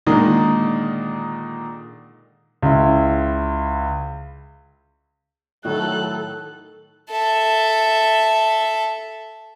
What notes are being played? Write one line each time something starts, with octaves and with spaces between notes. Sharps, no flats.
A#2 D3 D#3 G#3 D#4 G#4
C#2 E4
A2 D#3 F#3 A4 F#6
A4 E5